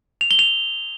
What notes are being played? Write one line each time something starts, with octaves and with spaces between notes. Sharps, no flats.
F7
G7
F7